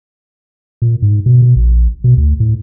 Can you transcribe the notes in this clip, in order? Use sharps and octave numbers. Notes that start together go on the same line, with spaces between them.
A#2
G#2
B2
B2
A#1
B2
D2
A2